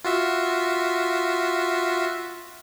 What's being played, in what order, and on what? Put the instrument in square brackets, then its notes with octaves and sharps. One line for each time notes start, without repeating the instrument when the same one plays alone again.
[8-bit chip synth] F4 F#4 E5